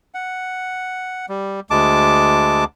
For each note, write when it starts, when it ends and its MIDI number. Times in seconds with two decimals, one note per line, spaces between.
0.14 1.26 78
1.29 1.60 55
1.71 2.64 38
1.71 2.64 56
1.71 2.64 81
1.71 2.64 86